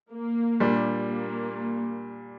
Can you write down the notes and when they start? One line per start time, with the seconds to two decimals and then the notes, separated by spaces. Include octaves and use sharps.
0.11 A#3
0.60 A#2 G3 D4
1.09 A#3